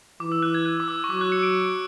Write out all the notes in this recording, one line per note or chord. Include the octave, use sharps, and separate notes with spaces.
E3 D6
E6
F#6
G#6
F#6
D6
E6
C#6
F#3 D6
F#6
C#7
D7